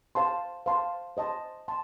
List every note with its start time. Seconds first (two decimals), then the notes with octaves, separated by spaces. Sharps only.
0.15 C5 F5 A5 C6
0.66 C5 F5 A5 C6
1.17 C5 D#5 A5 C6
1.68 A5 C6